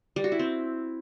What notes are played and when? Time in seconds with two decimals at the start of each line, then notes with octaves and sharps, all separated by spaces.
0.16 G3
0.24 F#4
0.32 E4
0.39 C4